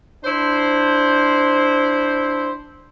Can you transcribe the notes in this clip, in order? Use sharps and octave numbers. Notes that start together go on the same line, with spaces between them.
D4 E4 C5